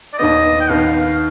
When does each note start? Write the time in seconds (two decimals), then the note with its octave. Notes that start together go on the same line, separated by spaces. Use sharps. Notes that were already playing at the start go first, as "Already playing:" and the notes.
0.13 D5
0.18 D#2 D#3 B3 D#5
0.61 G5
0.70 D#2 D#3 B3 F5